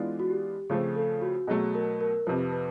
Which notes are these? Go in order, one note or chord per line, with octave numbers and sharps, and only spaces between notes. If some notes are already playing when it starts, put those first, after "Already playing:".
Already playing: E3 G#3 B3 D4 F4
F#4
G4
C#3 F3 A3 C4 G#4
A4
F#4
B2 F#3 A3 G#4
A#4
A#4
F2 C3 F3 B4
B4